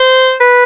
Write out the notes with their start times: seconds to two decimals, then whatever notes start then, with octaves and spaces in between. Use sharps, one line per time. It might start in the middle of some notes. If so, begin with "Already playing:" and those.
Already playing: C5
0.40 B4